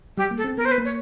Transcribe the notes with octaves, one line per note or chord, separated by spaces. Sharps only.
G3 G4
A#3
A4
C4
B3 A#4
C5
B4
A#3
C#5